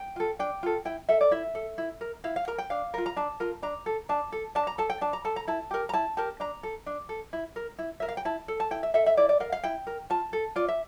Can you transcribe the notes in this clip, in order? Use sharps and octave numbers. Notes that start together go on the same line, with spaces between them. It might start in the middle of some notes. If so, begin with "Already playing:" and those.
Already playing: G5
F4 A4
D4 G5
F4 A4
E4 G5
A4 E5
D5
E4 E5
A4
E4
A#4
E4 F5
F5
A#4 A#5
G5
D4 F5
F4 A#4
A#5
D4 A5
F4 A#4
D4 A#5
A4
D4 A5
A4
D4 A5
A#5
A4 A5
G5
D4 A5
A#5
A4 A5
A#5
E4 A5
G4 A#4
A#5
E4 A5
G4 A#4 A5
D4 A#5
A4
D4
A4
E4
A#4
E4
A#4 E5
F5
G5
E4 A5
A4
A5
E4 G5
E5
A4 E5
E5
E4 D5
D5
A#4 F5
F5
E4 G5
A#4
F4 A5
A4
F4 D5
E5